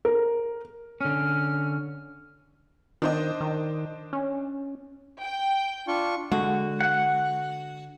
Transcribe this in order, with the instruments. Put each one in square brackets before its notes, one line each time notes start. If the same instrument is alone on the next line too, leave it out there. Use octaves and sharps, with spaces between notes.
[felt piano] A#4
[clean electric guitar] D3 C#4 [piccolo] F6
[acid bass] D#3 [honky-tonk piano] D4 C5 D#5
[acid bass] D#3
C#4
[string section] G5
[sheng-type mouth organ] D4 F4 C#6
[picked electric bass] D3 [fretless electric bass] G#3 [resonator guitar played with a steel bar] F#4
[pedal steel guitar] F#5